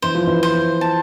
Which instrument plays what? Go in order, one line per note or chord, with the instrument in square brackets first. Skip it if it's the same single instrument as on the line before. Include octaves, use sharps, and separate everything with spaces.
[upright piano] E3 [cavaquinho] C5
[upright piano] F3
E3
[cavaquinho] C5
A5